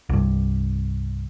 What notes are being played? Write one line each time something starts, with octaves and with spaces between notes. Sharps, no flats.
C2 G2